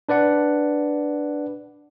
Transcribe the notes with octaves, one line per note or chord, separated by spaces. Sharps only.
D4 B4 D5 F#5